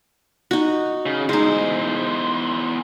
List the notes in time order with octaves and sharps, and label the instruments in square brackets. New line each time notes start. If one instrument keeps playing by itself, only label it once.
[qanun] D#4 F#4
[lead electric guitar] C#3
[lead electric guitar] E2 C5 [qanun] G#3 D#4